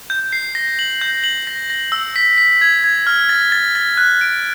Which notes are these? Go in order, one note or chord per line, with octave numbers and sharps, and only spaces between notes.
G6
C7
A#6
F#7
G6
F#7
A#6
A#6
E6
B6
B6
G#6
G#6
F6
A6
A6
A6
F#6
D7